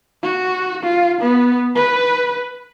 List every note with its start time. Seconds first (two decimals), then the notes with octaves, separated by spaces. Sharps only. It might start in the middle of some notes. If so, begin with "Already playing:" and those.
0.23 F#4
0.83 F4
1.21 B3
1.75 B4